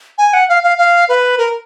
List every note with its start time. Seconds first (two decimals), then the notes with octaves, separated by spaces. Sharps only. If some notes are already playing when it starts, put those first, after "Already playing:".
0.18 G#5
0.34 F#5
0.49 F5
0.63 F5
0.78 F5
1.09 B4
1.38 A#4